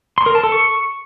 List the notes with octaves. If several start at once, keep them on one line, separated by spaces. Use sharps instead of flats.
C6
A#4
A5
A4
C#6